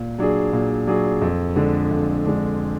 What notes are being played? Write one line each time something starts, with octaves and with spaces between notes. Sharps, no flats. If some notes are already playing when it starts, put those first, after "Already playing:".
Already playing: A#2
F#3 D4 G#4
A#2
F#3 D4 G#4
F2
D3 G#3 D4
F2
D3 G#3 D4